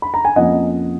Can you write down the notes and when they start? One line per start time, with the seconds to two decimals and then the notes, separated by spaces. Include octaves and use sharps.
0.02 B5
0.14 A#5
0.25 G#5
0.36 F2 F3 A#3 C#4 D#5 F#5